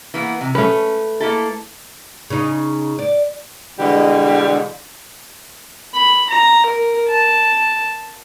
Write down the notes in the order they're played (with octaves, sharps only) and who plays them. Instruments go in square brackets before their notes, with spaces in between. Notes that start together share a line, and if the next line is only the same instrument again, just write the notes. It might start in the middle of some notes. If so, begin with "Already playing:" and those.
[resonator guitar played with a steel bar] E3 A#3 B3
C3
[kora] A3 B4 [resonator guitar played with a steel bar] C#4
[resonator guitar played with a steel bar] A#3 E4 A4
[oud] C#3 D#4
D5
[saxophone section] B2 D3 E3 G3 G#3 G4
[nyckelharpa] B5
A#5
A#4
A5